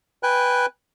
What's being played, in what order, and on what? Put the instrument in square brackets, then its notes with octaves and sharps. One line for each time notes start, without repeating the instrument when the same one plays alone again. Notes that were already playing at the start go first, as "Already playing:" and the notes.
[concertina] B4 G5 G#5 F#6